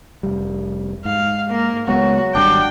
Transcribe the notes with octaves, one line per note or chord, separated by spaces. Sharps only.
F1 G3
G#2 F5
A#3
C#2 F#3 G#3 B3 F#4
G#1 C#3 G3 D4 G5